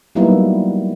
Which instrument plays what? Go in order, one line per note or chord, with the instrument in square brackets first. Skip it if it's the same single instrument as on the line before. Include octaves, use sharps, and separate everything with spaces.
[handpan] F#3 G3 A#3 B3 D#4 E4